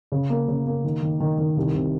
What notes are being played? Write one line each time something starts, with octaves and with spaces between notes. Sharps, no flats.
C#3
A#3
C#3
A#3
D#3
D#3
D#3
D#3
C2
C3